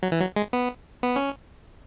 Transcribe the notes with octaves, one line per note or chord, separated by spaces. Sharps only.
F#3
E3
F#3
G#3
B3
B3
C#4